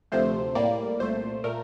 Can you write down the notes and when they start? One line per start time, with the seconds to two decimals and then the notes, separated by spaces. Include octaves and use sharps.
0.12 D2 C3 F3 A3 C5
0.55 A2 G3 A#3 D5
1.00 C2 A#2 A3 C5
1.44 A#2 A3 A#4